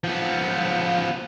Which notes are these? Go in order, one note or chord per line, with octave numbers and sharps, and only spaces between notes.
F3 B3